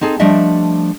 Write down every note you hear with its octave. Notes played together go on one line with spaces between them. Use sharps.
C4 D#4 G#4 A4
F3 G3 A3 D4 D#5 E5